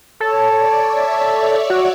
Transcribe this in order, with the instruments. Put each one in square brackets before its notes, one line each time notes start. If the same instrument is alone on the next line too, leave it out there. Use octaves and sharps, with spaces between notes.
[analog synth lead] A4 [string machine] C#5
[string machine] D5
E5
[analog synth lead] F#4